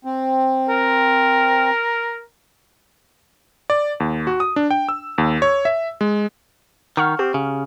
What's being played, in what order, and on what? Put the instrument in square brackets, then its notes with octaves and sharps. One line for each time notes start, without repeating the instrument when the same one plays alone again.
[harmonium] C4
[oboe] A#4
[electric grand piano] D5
D#2
F#4
D#6
D4
G5
E6
D#2
C#5
E5
G#3
[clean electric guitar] D#3 [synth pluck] F#5 C#6 F6
[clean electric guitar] C4 [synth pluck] G4
[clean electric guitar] C#3